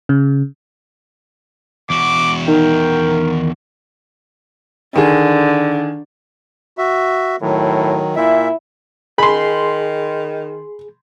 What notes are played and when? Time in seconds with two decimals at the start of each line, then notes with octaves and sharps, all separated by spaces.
0.09 C#3
1.90 E2 F#4 D6
2.48 D#3 A#4 G5
4.96 D3 D#3 G#4
6.78 F#4 E5
7.42 A2 D#3 F#3
8.16 A#2 E4 E5
9.18 D#3 G#4 B5 C6